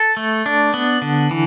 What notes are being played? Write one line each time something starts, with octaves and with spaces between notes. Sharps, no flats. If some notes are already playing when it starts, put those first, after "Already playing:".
Already playing: A4
A3
D4
B3
D3
E3